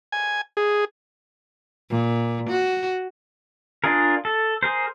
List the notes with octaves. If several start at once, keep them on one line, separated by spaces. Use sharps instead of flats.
G#5
G#4
A#2
F#4
D4 F4 G#4 A#4
A4
G#4 A#4 C5